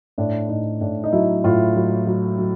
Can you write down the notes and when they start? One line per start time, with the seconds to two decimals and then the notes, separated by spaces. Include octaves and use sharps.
0.18 A2 D4
0.49 A2 D#4
0.81 A2 D4
1.04 D#4
1.12 F#3 E4
1.44 A2 F4
1.76 F#3
2.07 F#3
2.38 F#3